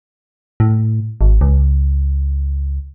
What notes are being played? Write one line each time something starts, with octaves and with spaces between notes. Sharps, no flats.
A2
G#1
C#2